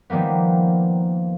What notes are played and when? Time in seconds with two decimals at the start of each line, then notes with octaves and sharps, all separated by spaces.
0.10 D#3 F3 G3 A#3 B3